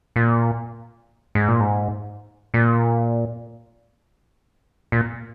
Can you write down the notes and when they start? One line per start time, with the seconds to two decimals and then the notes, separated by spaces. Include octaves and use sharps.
0.16 A#2
1.35 G#2
1.48 A#2
1.60 G#2
2.54 A#2
4.92 A#2